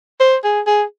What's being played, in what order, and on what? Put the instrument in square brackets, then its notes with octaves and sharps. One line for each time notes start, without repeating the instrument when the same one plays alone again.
[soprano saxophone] C5
G#4
G#4